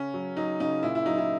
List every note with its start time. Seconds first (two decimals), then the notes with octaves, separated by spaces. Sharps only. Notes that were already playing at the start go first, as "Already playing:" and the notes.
Already playing: C#3 C#4
0.14 F#3
0.37 F#3 D#4
0.60 C#3 D#4
0.83 A#2 E4
0.95 E4
1.06 F#3 D#4
1.18 E4